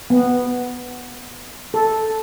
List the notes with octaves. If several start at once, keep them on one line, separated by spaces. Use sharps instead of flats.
B3
A4